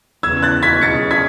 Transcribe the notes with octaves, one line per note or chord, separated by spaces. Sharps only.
E2 C#3 E3 E6 G#6
F#6 A6
G#6 B6
B2 F#3 C#4 G#4 A6 C#7
G#6 B6